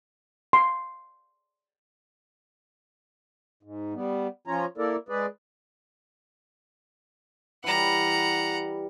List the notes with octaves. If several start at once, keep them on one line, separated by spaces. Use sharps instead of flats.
C6
G#2
G3 B3
F3 C#4 F4 C#5 A#5
A#3 E4 A4 A#4 D5
G#3 G#4 B4 D5
E3 G3 F#5 A#5